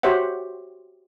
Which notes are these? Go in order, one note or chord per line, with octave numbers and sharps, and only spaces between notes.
F#4 G4 C5 C#5 E5 F#5